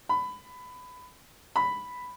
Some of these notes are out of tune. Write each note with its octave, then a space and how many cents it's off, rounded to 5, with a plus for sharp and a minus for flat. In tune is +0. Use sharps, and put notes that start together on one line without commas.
B5 +20
B5 +5